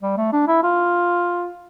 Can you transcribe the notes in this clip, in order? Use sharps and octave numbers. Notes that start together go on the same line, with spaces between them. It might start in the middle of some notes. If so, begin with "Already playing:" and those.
G3
A3
D4
E4
F4